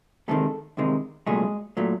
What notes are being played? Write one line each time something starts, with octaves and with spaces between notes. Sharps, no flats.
E2 C3 D#3 G#3 A3 A4
E2 C3 D#3 G#3
C2 A#2 F#3 G#3 A3 G#4
A#2 F#3 A3